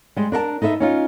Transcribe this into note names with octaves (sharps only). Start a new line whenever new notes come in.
G3 G#3
D4 A#4 E5 A5
D#4 A4 B4 E5
C#4 D#4 F4